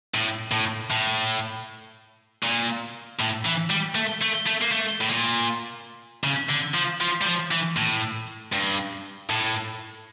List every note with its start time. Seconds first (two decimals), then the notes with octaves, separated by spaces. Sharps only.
0.14 A2
0.52 A2
0.90 A2
2.43 A#2
3.19 A2
3.45 E3
3.70 G3
3.95 A3
4.21 A3
4.46 A3
4.61 A#3
4.71 A3
5.01 A2
5.10 A#2
6.24 C#3
6.50 D3
6.75 F3
7.01 F3
7.22 G3
7.26 F3
7.51 E3
7.77 A2
8.53 G2
9.30 A2